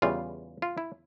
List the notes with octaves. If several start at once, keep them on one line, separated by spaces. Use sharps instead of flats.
E2 C#3 E3 G3 F4
F4
E4